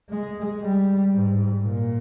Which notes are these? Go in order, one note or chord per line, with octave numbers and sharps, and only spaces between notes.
G#3
G3
G#2
A#2